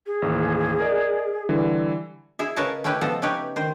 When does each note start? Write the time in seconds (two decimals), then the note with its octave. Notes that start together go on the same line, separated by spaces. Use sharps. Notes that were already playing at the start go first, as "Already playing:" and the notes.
0.06 G#4
0.22 A1 D#2
0.80 A#4 D5 D#5
1.49 D3 E3 G3
2.39 E4 G#4 E5
2.56 C#3 A#4 B4 C#5 D#5 A5
2.84 A3 C#4 E4 G4 B4
3.01 F3 B3 A4 D#5
3.22 C#3 A3 D#4 G4 B4 C#5
3.56 D#3 C5